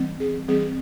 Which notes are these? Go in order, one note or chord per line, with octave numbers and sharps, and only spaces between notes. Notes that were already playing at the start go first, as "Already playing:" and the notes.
Already playing: E3 G3 C4
G#4
E3 G3 C4 G#4